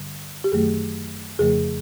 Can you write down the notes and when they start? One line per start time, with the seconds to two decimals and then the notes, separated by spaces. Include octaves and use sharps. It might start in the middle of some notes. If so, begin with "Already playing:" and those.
Already playing: G2 D3 G3
0.44 G4
0.52 F#2 D#3 F#3 A3 G#4
1.39 F2 C#3 F3 A3 G#4